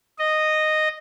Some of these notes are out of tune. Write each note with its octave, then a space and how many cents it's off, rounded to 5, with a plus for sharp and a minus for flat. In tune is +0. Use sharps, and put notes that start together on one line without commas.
D#5 -10